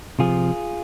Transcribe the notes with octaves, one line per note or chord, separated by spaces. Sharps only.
C3 F3 F4 G#4